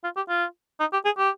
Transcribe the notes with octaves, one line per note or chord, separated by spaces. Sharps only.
F4
G4
F4
D#4
G4
G#4
G4